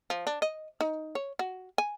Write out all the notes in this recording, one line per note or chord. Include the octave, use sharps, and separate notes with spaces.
F3
D4
D#5
D#4
C#5
F#4
G#5